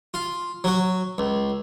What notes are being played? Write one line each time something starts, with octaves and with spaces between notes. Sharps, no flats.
F4
F#3 F#4
C#2